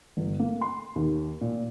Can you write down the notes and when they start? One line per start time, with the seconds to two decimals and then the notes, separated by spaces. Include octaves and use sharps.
0.17 G1
0.40 A#3
0.61 C6
0.96 D#2
1.41 A#2